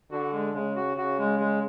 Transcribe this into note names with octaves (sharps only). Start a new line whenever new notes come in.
D3 F#4
G#3
C#3 G#3
F#4
C#3 F#4
G#3
G#3